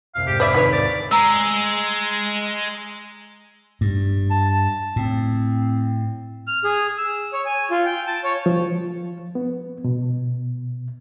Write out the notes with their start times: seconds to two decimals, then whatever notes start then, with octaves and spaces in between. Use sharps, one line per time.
0.15 F1 C2 F2 F5
0.27 G#2 G#3 G4
0.40 C5 D5 E5 B5
0.54 E2 D#3 F3 D#4 B4 C#5
0.72 D#2 G#2 C#3 D5
1.11 G#3 A#5 E6
3.81 G2
4.31 A5
4.96 A2 C4
6.47 F6
6.64 G#4
6.98 E6
7.33 C#5
7.46 G#5
7.71 F4
7.86 G5
8.07 A5
8.24 C#5
8.46 F3
9.35 B3
9.85 B2